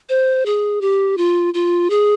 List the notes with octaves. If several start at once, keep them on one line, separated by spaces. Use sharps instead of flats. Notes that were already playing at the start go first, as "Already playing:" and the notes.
C5
G#4
G4
F4
F4
G#4